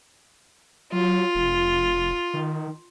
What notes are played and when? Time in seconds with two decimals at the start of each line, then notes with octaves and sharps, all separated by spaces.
0.92 F#3 F4
1.35 F1
2.34 D#3